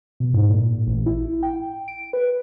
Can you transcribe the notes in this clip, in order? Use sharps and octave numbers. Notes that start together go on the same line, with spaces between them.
B2
G#2
A#2
A1
E4
G5
D7
B4